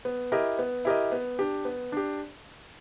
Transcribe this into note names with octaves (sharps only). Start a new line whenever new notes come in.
B3
E4 G4 A#4 D#5
B3
E4 G4 A#4 D#5
B3
D4 G4
B3
D4 G4